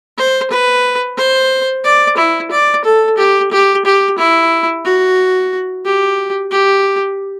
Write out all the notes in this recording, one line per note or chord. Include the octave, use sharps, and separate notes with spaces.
C5
B4
C5
D5
E4
D5
A4
G4
G4
G4
E4
F#4
G4
G4